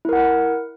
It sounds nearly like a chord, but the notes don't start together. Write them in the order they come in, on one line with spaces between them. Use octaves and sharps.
E4 A#4 F#5